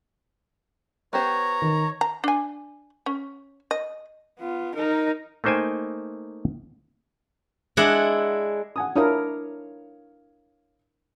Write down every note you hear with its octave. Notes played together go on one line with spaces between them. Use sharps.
B3 G4 C5 C#5 A#5
D#3
A#5
D4 G#5
C#4
D#5
B3 F4
D#4 A#4
A3 A#3 D#4 C5 G5 G#5
G#3 D4 E4 G#4 F#5
F#5 G#5 D#6
D4 E4 A#4 C#5 F5 D#6